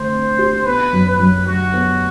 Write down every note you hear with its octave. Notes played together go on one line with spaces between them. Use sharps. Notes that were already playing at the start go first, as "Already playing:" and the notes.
Already playing: D3 A3 C5
C4
G4
B3 B4
F#2
B4
F#2
F#3 F#4
B3